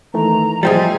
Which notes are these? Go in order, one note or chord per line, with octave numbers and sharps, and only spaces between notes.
D#3 E3 A3 A#5
A2 F3 G3 G#4 C5 D#5 G5 A6